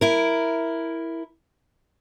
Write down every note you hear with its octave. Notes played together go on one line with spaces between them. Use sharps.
E4 A#4